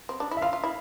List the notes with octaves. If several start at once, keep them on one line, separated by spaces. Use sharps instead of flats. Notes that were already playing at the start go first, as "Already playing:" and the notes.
C4
D4
E4
E5
F4 F5
F4
E4